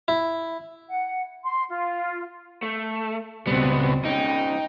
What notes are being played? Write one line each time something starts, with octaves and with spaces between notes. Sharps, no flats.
E4
F#5
C6
F4
A3
C#2 B2 G3 B3 C4
G#2 C#3 D#4 G5